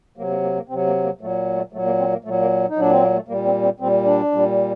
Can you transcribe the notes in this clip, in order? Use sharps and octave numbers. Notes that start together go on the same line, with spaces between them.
C3 F#3 A#3
A#3
A#3
A#3
C3 F#3 C4
A#3
A#3
A#2 F#3 A3
A3
A#2 F#3 A3
A#3
C4
A#3
A#2 F#3 A3
A#3
D#4
A#2 F#3 D4
C4
A#3
A3
A#2 G3 A#3
C4
C4
A#2 G3 C4
D4
A#2 G3